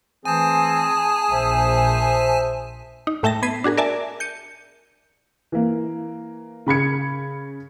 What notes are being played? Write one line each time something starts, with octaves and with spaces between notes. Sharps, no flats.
E3 A3 C4 G#4 G#5 A5
A#1 C5 E5
D#4
A2 A3 E5 G5 A5 A#6
B3 G#6 B6 C7 D#7
D4 F#4 G#4 A#4
A#4 D5 E5 G#5 A5
G6 C#7 D#7
E3 A#3
C#3 B5 G#6 C#7